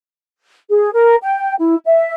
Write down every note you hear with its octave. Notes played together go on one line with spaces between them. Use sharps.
G#4
A#4
G5
E4
E5